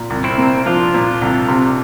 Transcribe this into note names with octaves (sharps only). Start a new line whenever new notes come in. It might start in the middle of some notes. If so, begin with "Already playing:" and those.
Already playing: A#2
C2
C4 E4
A#3
F3 D4 F4
A#2
C2
C3